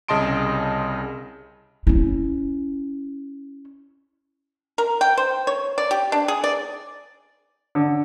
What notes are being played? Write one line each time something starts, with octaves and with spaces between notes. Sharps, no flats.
C2 C#3 D#5 A5 C6 D7
C#4 E4
A#4
G5
C5
C#5
D5
G4
D4
G#4
D5
D3